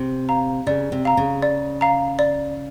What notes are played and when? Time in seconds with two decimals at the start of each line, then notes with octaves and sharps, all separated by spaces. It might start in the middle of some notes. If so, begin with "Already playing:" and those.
Already playing: C3
0.29 F5 A#5
0.67 C#3 D5
0.92 C3
1.05 F5 A#5
1.17 C#3
1.42 D5
1.81 F5 A#5
2.19 D5